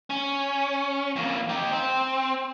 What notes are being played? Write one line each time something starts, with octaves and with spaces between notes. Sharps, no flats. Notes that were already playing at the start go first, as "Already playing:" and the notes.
C#4
F2 A#3
D#4 G4
C4